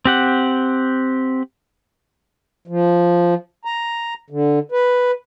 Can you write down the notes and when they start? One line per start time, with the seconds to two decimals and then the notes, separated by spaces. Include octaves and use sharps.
0.05 C4 G4 F#5
2.68 F3
3.65 A#5
4.30 D3
4.72 B4